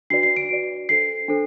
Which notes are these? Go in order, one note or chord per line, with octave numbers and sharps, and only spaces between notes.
D4 F#4 B4 D5 C7
C7
D7
D4 F#4 B4 D5
D4 A4 C5 C7
D4 A4 C5